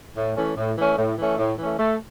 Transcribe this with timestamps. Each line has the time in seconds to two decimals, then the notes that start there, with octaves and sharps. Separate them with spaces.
0.17 A2
0.37 E3 A3 C#4
0.57 A2
0.77 E3 A3 C#4
0.98 A2
1.18 E3 A3 C#4
1.38 A2
1.59 E3 A3 C#4
1.79 A3